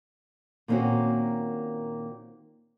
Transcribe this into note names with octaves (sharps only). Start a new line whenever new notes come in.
A#2 D#3 A#3 C4 C#4 F#4